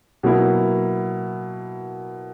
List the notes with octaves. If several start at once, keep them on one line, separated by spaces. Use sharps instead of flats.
B2 F#3 A#3 E4